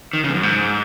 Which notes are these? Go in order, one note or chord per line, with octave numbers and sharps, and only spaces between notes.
D#3
C#3
E2
F#2
G#2